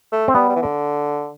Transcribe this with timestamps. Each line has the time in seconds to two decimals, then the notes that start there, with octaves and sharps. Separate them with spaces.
0.12 A3
0.28 C4
0.35 G3 B3
0.49 G3
0.56 E3
0.62 D3